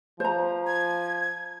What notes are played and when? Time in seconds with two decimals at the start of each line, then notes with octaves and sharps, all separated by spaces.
0.20 F3 C5 A#5
0.67 G#6